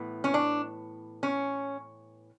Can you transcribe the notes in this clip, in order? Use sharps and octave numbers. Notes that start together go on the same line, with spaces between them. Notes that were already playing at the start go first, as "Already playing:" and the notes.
Already playing: A2 E3 B3
C#4
D4
C#4